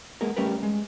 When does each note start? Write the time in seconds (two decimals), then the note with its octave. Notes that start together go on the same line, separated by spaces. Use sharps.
0.21 G#3 A#3 B3 G#4 A#4
0.36 G3 A3 C#4 G4 A#4 B4
0.63 G#3